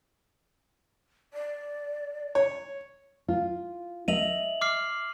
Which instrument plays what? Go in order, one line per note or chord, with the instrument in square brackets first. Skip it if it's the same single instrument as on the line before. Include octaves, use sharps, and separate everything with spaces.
[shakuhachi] D5
[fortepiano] C#5
[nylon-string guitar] F4
[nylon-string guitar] D#5 E5 [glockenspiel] D#7 F7 F#7
[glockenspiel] D6 F6 C7